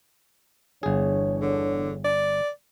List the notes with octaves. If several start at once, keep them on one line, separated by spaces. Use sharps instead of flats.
G1 E2 D4 G#4 C#5
D3
D5